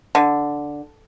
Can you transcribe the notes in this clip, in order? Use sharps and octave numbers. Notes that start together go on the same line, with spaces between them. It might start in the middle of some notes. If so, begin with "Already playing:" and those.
D3